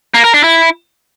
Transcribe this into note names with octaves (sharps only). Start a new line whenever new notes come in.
A#3
A#4
D4
E4